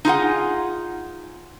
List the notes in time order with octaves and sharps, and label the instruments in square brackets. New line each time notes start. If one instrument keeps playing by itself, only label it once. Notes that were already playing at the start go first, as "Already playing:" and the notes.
[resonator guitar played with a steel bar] D#4 F4 G#4 F#5